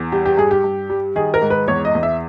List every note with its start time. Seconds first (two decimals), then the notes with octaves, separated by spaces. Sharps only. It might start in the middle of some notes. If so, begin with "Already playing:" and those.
Already playing: E2
0.12 G3 G4
0.26 G4
0.37 G2 G#4
0.51 G4
0.64 G2
0.90 G3
1.16 D#3 G#4
1.34 A#4
1.42 G#2
1.50 B4
1.68 E2 C#5
1.85 D#5
1.95 E2
2.03 E5